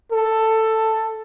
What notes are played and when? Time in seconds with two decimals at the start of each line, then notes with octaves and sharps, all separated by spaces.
0.12 A4